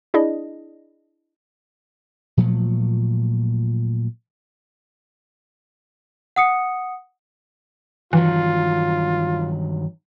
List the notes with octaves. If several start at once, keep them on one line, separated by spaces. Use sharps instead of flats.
D4 E4 G#4 D5 D#5
A#2 F3 F#3 A3
F#5 D#6 C#7
G2 D#3 E3 F#3 F4